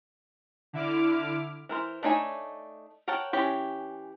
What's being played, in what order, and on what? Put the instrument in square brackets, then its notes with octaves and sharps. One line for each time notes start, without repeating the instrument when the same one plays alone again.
[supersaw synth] D3 E4 D6 F6
[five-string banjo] E3 A#4 C5
A3 D4 D#4 C#5 G#5
A#4 C#5 F#5 G5 A5
E3 C#4 G4 C#5